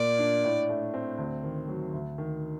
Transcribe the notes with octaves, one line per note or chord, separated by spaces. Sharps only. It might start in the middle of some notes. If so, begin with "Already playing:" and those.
Already playing: A#2 A#3 D5
D4
A2
A3
C4
D2
D#3
F#3
D2
D#3